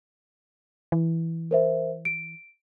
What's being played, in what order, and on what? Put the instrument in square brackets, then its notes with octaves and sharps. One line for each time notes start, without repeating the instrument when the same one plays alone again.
[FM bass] E3
[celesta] A#4 C5 E5
D7